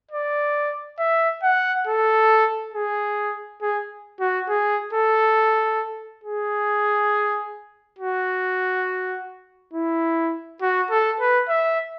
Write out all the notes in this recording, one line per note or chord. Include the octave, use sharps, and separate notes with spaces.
D5
E5
F#5
A4
G#4
G#4
F#4
G#4
A4
G#4
F#4
E4
F#4
A4
B4
E5